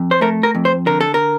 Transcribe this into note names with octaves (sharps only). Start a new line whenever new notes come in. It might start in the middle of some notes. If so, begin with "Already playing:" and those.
Already playing: F2
C5
A3 A#4
A#4
F2
C5
D3 A#4
A4
A#4